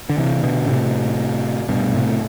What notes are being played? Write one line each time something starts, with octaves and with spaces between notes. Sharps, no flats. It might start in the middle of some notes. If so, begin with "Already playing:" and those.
D3
C3 E3
B2 D3
A2 C3
G2 B2
A2 C3